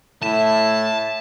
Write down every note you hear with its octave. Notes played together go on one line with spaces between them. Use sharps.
A2 E4 A5